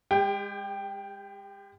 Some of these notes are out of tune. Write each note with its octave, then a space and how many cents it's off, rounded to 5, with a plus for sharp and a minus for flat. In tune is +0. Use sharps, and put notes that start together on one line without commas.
G#3 -30 G4 +35 G5 +0